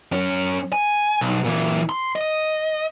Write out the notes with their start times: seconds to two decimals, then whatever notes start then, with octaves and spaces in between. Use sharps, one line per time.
0.12 F#2 C#4
0.73 G#5
1.21 B1
1.44 A#2 E3
1.89 C6
2.16 D#5